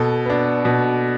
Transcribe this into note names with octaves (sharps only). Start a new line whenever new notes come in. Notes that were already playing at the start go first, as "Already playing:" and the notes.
Already playing: B2 A4
B3 D4
B2